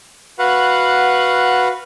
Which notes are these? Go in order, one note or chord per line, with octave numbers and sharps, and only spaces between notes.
F#4 B4 F5 F#5